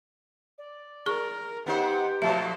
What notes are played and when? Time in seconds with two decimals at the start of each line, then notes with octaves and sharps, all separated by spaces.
0.58 D5
1.06 G#4 A#4 C#6
1.66 B3 D#4 G4 C5 F#5
2.22 B2 F3 A3 C5 E5 A5